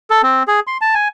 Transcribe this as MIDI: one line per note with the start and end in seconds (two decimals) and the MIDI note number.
0.10 0.22 69
0.23 0.43 60
0.48 0.60 68
0.67 0.77 84
0.81 0.94 81
0.94 1.08 80